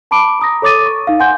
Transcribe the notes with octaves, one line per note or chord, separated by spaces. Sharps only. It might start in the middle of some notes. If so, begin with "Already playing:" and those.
A5 B5 D6 D7
A#5 D#6 A#6
A4 C#5 D6 D#6 A6 D#7
C#6
D#4 F5
F#5 G#5 C6 G6